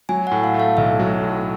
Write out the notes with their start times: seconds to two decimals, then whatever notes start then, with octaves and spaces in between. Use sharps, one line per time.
0.09 F#3 G#5
0.27 A2 F#5
0.44 F5
0.54 A3
0.59 F5
0.77 B1 E5
0.99 F#3
1.22 A2